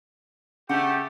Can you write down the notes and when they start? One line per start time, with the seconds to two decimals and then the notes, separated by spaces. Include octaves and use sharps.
0.69 C#3 A3 G4 F#5